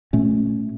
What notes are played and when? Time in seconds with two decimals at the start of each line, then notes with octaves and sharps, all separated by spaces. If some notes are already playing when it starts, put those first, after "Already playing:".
0.13 A#2 A3 C#4